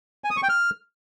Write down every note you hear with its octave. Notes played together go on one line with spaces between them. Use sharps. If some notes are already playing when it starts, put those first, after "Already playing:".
G#5
D#6
C#6
G5
F6